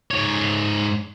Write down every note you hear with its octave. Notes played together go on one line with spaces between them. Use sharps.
G#2 C#5